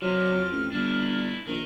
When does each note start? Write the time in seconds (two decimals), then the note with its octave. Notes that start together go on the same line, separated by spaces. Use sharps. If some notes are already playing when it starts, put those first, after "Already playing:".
0.02 C3 F#3 A#3 F6
0.30 F2
0.51 A1
0.72 G1 D4 E4
1.47 A#1 D#3 A#4